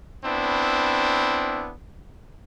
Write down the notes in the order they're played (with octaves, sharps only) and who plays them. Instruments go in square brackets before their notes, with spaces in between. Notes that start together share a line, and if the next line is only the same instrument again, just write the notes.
[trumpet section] B3 C4 D4 E4